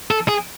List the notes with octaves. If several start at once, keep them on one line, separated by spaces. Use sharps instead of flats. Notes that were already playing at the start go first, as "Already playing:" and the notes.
A4
G#4